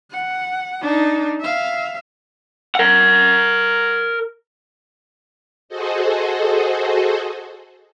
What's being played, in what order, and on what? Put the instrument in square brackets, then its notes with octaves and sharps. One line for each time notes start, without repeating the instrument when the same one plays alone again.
[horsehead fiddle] F#5
D4 D#4
E5 F5
[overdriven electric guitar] A#4 F#5
[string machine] F#4 G#4 A4 C5 D#5